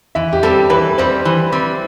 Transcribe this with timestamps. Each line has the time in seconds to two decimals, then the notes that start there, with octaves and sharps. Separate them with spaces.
0.15 E3 E5
0.33 G4
0.43 G3 C4 A4
0.70 E3 B4
0.98 G3 C4 C5
1.25 E3
1.52 G3 C4